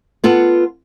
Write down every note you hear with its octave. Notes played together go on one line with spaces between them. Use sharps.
B3 F4 A4 F#5